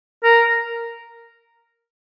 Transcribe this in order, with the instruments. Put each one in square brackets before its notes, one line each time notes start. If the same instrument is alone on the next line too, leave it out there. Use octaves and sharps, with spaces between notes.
[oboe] A#4